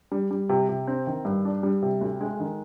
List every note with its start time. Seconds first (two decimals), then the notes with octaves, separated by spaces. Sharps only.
0.12 G3
0.31 G3
0.49 C3
0.69 C3
0.87 C4
1.07 D#3
1.25 G2
1.45 D4
1.63 G3
1.82 C3
2.01 D2
2.21 G#3
2.40 D#3